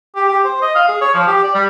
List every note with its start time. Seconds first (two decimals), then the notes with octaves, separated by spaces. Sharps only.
0.16 G4
0.29 G4
0.45 C5
0.62 D#5
0.75 F5
0.89 G#4
1.01 C#5
1.14 F3
1.28 G4
1.44 D5
1.55 G3